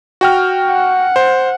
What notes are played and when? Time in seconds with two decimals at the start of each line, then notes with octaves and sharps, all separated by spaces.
0.21 F#4 G5 F6
0.68 F#5
1.16 C5